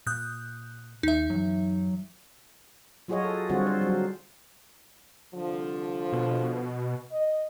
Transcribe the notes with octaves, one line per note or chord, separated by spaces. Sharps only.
A#2 D#6 F#6 G6
D#2 D#4 E5
F#2 E3 F#3
F#3 F4 F#4 G#4 C#5 D#5
A4
D3 G3 C4 F4 F#4 G#4
C5
F#3
C2 D3 F3
B2
D#5